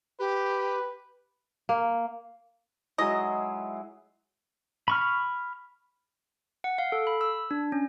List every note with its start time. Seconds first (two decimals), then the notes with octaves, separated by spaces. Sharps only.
0.20 G4 B4
1.69 A#3
2.98 F#3 G#3 E4 D#5
4.88 B5 C#6 F6
6.64 F#5
6.78 F5
6.92 A4
7.07 B5
7.21 E6
7.51 D4
7.72 C#4